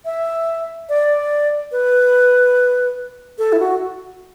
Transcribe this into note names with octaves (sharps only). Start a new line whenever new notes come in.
E5
D5
B4
A4
E4
F#4